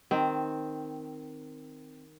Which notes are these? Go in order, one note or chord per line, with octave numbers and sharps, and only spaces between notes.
D#3 C4